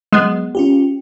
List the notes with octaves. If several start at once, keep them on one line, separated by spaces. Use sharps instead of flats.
F#3 G#3 B3
C#4 F4 G4